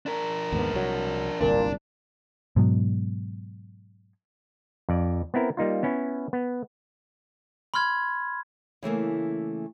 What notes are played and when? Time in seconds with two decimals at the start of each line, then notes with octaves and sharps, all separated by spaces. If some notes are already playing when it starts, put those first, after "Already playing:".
0.06 D4 A#4
0.52 D#2 G#2 B3
0.74 C2 F#3
1.41 D1 G1 C2 A#2 D4
2.56 G#2 B2 F#3
4.89 F2 D5
5.34 B3 C4 E4 A#4
5.57 G3 A#3 D#4 F4
5.83 B3 C#4 E4
6.33 B3
7.74 B5 C6 F6 G#6
8.83 C#3 E3 A3 A#3